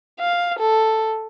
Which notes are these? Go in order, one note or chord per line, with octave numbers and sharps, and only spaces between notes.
F5
A4